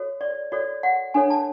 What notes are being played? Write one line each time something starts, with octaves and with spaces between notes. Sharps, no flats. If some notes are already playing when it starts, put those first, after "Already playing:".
Already playing: F#4 A4 C#5
D5
F#4 A4 C#5 D5
F#5
D4 A4 C#5 G#5
A5